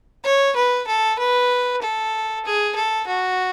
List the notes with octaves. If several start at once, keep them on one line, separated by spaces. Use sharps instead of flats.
C#5
B4
A4
B4
A4
G#4
A4
F#4